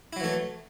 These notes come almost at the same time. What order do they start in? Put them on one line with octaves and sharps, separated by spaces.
E4 F#3 E3 A3